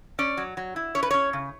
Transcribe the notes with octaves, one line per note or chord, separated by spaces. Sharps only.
C#4 D5
F#3
F#3
E4
C#4 C#5
B4
C#4 C#5
C#3